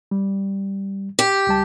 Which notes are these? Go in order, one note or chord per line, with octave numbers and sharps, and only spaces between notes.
G3
G4
C#2 G3 A5